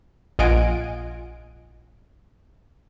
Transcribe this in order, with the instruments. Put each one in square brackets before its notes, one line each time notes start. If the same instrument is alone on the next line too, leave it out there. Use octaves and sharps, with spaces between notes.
[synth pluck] A#1 F4 D#5 F#5 G#5 D7